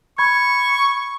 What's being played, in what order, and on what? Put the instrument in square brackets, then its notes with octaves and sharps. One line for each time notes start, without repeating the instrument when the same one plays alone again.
[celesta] B5 G#6 [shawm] C#6